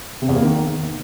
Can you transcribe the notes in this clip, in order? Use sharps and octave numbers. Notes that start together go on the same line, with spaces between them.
C3
E2
A#3
D#3